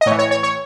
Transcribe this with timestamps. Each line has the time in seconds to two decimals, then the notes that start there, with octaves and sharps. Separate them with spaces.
0.01 D#5
0.06 A2 C#5
0.11 E3
0.19 C#5
0.31 C#5
0.43 C#5